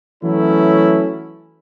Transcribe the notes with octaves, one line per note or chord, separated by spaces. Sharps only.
E3 F#3 A3 C#4 E4